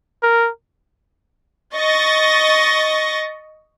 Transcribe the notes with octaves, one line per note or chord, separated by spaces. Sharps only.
A#4
D#5 C#6 A6 A#6